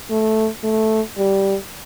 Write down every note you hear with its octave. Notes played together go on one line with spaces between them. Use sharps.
A3
A3
G3